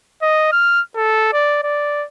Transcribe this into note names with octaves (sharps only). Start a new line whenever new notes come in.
D#5
F6
A4
D5
D5